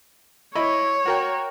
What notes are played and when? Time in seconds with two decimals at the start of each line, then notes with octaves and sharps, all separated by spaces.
0.55 E4 C#5 D#5 B5
1.05 F#4 A#4 G5